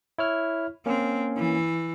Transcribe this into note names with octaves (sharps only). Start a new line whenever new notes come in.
E4 C#5 F6
A#3 C4 C#4
E3